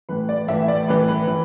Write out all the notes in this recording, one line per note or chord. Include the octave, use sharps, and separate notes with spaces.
A2 E3 B4
D5
A2 E3 E5
D5
A2 E3 B4
B4
E3